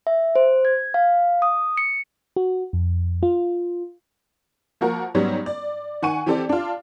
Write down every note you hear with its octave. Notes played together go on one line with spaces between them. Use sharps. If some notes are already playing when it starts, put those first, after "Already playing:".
E5
C5
G#6
F5
D#6
C#7
F#4
F2
F4
F3 A#3 F#4 A#4
G#2 F#3 G3 B3 C#4
D5
D#3 F#5 G#5 C#6 D#7
E3 C4 G4 A4 D5
D4 F4